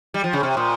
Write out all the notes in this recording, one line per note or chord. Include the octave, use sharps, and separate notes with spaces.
G3
F3
C#3
C3 C#6 F6
A#2 C6 D#6